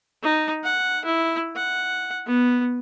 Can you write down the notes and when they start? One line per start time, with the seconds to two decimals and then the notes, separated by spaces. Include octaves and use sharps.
0.23 D#4
0.64 F#5
1.05 E4
1.56 F#5
2.27 B3